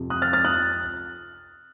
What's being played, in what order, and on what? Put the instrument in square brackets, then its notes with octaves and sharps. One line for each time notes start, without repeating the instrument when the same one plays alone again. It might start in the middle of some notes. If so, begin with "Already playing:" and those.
Already playing: [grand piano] F2 C3 F3
D#6 F#6
F6 A6
F6 A6
D#6 F#6